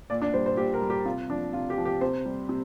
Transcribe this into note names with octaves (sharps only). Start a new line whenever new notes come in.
A#2 D5
D4
G3 C5
C5
A#2 G4
A#4
G3
G4
C3 F4
F3 D4
C3 F4
G4
F3
G4
C3 C5
G3
C3